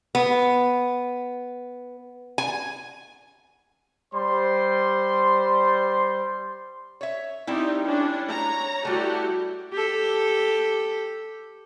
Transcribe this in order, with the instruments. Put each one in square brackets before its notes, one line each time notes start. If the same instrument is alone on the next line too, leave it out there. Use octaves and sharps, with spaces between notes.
[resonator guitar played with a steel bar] B3
G#5
[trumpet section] G3 C5 C6
[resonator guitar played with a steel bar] C#5 E5
[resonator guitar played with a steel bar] G3 C4 E4 [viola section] D#4 G4
[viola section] C#4 D4
C#5 A#5
[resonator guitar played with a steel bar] G3 A3 [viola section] E4 F#4 G4
[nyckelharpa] G4 A4